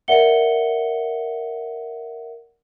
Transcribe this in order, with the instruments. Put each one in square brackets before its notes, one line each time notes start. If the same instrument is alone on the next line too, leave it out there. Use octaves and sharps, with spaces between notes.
[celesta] A#4 D5 E5 F#5 C#7 G7